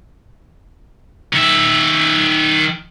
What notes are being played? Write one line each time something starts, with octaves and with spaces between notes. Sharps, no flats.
D#3 E5